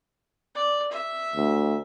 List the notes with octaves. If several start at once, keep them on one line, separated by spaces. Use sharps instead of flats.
D5
E5
D2